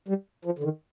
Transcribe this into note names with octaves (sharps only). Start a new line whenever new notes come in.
G3
F3
D3
D#3